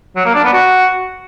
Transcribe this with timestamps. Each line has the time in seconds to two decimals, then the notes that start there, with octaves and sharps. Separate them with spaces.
0.16 F#3
0.26 A#3
0.35 D4
0.44 B3
0.53 F#4